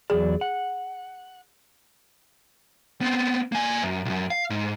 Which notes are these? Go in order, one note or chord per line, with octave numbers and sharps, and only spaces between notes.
E2 F#3 G#4 D5
F#5
B3 C4
A#3 G#5
F#2
B1 F#2
F5
G#2